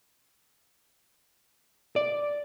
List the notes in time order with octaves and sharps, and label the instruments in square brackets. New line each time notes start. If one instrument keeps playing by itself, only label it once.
[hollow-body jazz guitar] D5